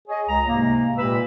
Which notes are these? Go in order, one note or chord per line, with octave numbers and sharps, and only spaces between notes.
G#4 C#5 D#5
C#2 A#5
G#2 C3 G#3 A#3
A#2 G#3 G4 B4 B5 E6